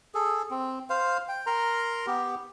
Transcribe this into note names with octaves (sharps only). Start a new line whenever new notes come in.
G#4 A4
C4
C5 F5
G5
A#4 A#5 C6
B3 G4